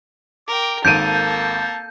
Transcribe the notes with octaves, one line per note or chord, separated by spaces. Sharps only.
A#4 G5 D6
G#1 A#3 A4 A5 G6 D7 D#7